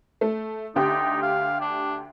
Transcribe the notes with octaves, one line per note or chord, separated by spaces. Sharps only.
A3
D2 D#4 G4
F5
D4